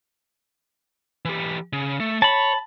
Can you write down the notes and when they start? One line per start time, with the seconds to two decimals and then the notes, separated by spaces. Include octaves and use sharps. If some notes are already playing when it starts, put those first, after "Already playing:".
1.25 E3 G4
1.73 C#3
2.00 A3
2.22 C#5 A5 B5